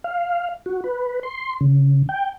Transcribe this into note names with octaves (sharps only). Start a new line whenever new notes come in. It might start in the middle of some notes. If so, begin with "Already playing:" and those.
F5
F#4
B4
C6
C#3
G5